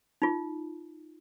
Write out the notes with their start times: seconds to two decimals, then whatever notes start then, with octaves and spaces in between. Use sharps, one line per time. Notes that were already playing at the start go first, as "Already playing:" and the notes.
0.22 D#4 F4